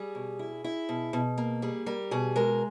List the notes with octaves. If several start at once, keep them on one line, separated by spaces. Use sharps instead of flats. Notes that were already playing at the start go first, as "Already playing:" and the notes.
Already playing: G3 G#4
B2
E4
E4
B2
B2
A#3
G3 G#4
G3 A#4
B2 G#4
G#3 A#4